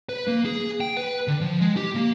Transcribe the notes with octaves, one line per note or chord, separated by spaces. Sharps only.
B4
A#3
G#4
G5
B4
D3
F3
G#3
G4
A#3